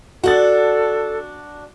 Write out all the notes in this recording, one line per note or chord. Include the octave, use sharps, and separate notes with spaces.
D4 F#4 A4 F#5 A6